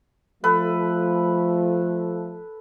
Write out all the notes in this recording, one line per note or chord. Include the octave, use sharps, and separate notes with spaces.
F3 A3 A4 B4